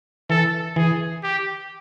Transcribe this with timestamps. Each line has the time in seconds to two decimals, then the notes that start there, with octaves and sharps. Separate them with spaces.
0.30 E3 A4
0.76 E3 G#4
1.24 G4